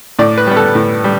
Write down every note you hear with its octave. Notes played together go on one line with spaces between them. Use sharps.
A2 D5
B4
G3 B3
A4
A2
G3